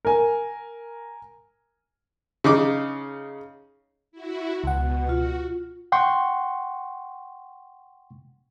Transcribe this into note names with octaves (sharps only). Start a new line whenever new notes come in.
A#4 G#5
C#3 D#4 D6
E4 F#4
C#2 B2 F#5
F4 F#4
F#5 G5 C6 C#6